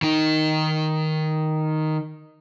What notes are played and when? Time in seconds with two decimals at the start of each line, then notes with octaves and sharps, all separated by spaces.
0.02 D#3 D#4